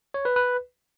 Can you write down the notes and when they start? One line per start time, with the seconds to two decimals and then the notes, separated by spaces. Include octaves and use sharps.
0.14 C#5
0.25 B4
0.36 B4